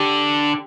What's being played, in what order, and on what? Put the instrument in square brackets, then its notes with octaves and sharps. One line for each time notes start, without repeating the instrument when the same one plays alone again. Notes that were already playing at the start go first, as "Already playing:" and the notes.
Already playing: [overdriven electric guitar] D3 [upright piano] G4